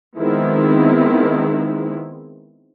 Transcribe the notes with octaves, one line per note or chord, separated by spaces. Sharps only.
D#3 F3 G#3 B3 C4 E4